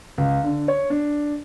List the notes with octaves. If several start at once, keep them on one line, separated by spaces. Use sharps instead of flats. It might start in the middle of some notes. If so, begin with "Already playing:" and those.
C#2
D3
C#5
D4